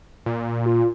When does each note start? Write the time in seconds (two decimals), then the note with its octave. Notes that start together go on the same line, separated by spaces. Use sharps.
0.26 A#2
0.66 F4